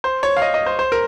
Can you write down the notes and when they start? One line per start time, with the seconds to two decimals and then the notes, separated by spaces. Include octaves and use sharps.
0.04 C5
0.23 C#5
0.37 F5
0.42 D#5
0.54 D#5
0.66 C5
0.79 C5
0.92 A#4